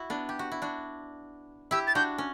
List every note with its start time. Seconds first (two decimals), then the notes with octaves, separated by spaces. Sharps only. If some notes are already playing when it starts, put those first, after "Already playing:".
Already playing: E4 F#4
0.10 B3 D4
0.29 G4
0.39 F#4
0.52 E4
0.62 D4 F#4
1.71 E4 G4 E6
1.87 A6
1.95 D4 F#4 G6
2.18 C#4